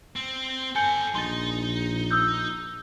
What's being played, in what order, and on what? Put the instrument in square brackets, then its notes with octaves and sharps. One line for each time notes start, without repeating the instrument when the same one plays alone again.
[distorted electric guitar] C4
[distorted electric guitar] A4 G5 [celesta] G#5 G6 C#7
[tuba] A#1 [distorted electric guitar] D#4 [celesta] C6 A6
[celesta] D#6 E6 G6